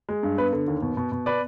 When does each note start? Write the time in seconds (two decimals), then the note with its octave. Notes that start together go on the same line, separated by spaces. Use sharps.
0.09 G#3
0.23 G2
0.38 B3 B4
0.53 D3
0.68 D#2
0.82 B2
0.97 B2
1.12 B2
1.26 B3 B4 D5